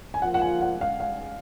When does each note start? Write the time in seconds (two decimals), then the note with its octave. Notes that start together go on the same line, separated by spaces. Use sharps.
0.14 G#5
0.21 F3 A#3 F4 F#5
0.34 F#5
0.41 G#5
0.61 F#5
0.81 F5
1.00 F5